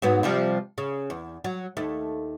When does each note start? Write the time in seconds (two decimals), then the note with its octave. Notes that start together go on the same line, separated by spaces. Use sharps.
0.02 G#2 F#3 B3
0.23 C3 F3 G3
0.78 C#3
1.10 E2
1.44 F#3
1.77 D#2 A3